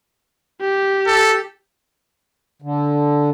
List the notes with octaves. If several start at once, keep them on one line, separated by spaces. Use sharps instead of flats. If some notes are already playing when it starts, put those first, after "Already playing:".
G4
A4
D3